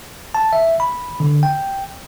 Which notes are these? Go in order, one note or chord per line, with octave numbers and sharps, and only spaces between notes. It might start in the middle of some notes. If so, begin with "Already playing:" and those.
A5
E5
B5
D3
G5